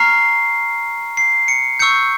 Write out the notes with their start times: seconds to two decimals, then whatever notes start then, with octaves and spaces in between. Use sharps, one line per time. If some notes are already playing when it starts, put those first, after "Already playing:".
Already playing: A#5 C#6 F6 C7
1.17 C7
1.48 C#7
1.79 C#6 E6 G6 C#7